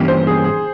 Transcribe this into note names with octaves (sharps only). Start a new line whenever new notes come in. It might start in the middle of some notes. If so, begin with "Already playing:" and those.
Already playing: G2 E3 A#3 C#4 G4
C5
G#4
G#4